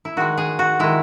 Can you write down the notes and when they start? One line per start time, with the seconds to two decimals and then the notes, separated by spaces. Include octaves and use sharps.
0.05 E4
0.17 D#3 G#3 F#4
0.37 G#4
0.59 F#4
0.79 D#3 G#3 E4